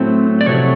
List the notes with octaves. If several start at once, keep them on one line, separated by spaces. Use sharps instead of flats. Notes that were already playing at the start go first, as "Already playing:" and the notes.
Already playing: A2 F#3 A3 C4
D5
F2 C3 F#3 A3 C#5